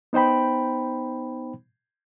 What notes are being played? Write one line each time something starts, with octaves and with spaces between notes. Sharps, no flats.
B3 D#4 C5 G5 B5